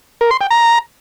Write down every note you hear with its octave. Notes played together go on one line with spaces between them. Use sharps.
A#4
C6
G5
A#5